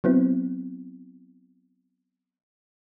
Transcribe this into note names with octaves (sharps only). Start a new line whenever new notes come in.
F#3 B3 C4 E4